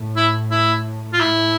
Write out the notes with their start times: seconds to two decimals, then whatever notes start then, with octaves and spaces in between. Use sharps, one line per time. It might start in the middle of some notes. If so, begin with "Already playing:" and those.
Already playing: A2
0.16 E4
0.51 E4
1.13 F4
1.20 A2 E4